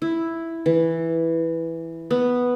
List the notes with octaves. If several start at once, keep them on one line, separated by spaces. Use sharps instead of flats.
E4
E3
B3